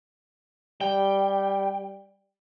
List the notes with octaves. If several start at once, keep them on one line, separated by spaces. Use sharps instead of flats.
G3 G5